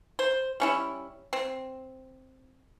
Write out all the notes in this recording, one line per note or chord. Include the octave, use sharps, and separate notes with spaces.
C5
G3 C#4 E4
C4